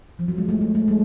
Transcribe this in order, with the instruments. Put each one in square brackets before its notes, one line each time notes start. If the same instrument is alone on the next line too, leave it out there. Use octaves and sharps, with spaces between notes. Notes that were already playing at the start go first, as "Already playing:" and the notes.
[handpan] F3
F#3
G#3
A3
A3
A3
G#3